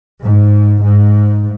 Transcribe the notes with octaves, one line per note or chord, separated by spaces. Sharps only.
G#2
G#2